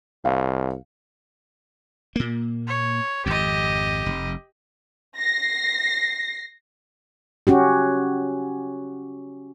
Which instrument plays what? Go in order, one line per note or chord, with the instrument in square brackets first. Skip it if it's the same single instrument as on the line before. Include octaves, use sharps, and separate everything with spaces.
[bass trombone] C2 [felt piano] F5
[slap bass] A#2 A#3
[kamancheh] C#5
[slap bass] G#1 F2 [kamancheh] G4 D#5
[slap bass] F1
[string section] A#6 C7
[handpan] C#4 F#4 G4